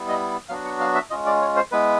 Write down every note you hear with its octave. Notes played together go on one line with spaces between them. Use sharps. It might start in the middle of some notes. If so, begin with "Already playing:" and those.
Already playing: G3 B3 E4
D#5
F#3 B3 D4 F#4 F5
F#5
F5
E5
G#3 C#4 F4 D#5
D5
C#5
C5
G#3 B3 E4 B4